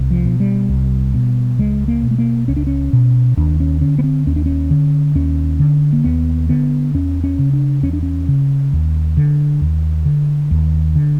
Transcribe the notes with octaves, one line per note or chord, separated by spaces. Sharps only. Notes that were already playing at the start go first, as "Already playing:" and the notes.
Already playing: C2
F3
B2
G3
C2
B2
C#2 G#3
A#3
B2
A3
A#3
C#2 C#4
D4
C#4
B2
D#2 D4
C#4
D3 C#4
B3
C4
D#2 C#4
D4
C#4
D3
D#2 C#4
D3
A#3
D#2 B3
D3 B3
E2 C#4
C#4
C#3
D4
E2 C#4
D4
C#4
C#3
D#2
D3
D#2
D3
D#2
D3